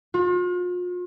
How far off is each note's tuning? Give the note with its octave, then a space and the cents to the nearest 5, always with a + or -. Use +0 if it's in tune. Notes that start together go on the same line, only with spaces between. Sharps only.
F4 +40